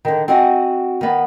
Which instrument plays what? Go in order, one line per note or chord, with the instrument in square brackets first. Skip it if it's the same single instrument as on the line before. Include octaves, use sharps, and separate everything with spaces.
[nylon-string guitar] D3 D#3
C4 F#4 D#5 F#5 G#5
D#3 B3